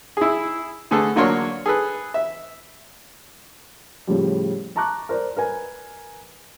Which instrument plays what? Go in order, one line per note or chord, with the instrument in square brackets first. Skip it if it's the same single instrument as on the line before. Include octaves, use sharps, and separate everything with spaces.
[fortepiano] E4 G#4
D3 A3 G#4 A4 B4
D3 F#3 A#3 D4 C#5 C6
G#4 A4 B4
E5
[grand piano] A2 C#3 F3 G3
A5 A#5 C#6 D6 F#6
A#4 C5 D5
A#4 B4 G#5